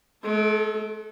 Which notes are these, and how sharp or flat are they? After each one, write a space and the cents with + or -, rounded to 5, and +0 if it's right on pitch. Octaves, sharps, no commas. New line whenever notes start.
G#3 +45 A4 +0